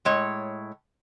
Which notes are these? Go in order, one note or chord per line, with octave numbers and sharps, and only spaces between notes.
A2 G#3 C#5